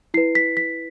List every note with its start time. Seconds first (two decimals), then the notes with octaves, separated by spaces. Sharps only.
0.14 E4 C7
0.17 B4
0.35 B6
0.57 B6